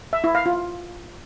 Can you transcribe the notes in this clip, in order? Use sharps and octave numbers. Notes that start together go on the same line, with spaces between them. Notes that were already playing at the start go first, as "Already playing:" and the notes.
E5
E4
F5
F4